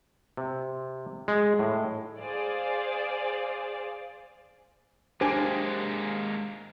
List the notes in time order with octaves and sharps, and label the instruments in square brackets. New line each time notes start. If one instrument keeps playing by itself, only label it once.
[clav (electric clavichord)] C3
G#3
A2
[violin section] G#4 C5 D5 F5
[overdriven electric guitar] G#3 A#3 [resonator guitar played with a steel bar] D4 G4 G5 [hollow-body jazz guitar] C5 [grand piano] G#5